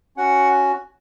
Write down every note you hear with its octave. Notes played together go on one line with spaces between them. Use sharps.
C#4 F#4 F#5